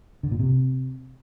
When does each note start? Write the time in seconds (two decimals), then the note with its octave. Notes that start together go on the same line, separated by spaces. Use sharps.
0.23 D3
0.31 A#2
0.40 C3